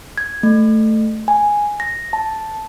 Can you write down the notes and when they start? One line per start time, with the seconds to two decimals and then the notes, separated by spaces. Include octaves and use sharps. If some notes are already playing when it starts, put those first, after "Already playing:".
0.18 G#6
0.43 A3
1.28 G#5
1.80 A#6
2.13 A5